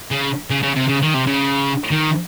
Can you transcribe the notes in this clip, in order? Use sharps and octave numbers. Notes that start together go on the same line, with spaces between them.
C#3
C#3
C#3
C3
C#3
D#3
C3
C#3
D#3